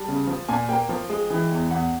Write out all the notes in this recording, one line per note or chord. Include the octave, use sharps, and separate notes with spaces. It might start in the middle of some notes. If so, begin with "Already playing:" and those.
Already playing: G3 A5
C#3
F3
A#2 G#5
A#3 G5
F3
G#3
E3
E2
E2 F#5